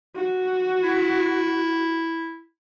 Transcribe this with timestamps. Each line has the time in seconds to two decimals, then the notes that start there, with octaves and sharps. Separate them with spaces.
0.16 F#4
0.83 E4